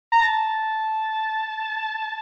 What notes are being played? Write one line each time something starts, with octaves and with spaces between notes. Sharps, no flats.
A#5
A5